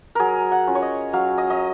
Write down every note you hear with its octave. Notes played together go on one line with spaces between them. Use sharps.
F#3 G#4 A#4
F#5
C#4 F4
C#5
D#5
F#3 F5
D#5
D#5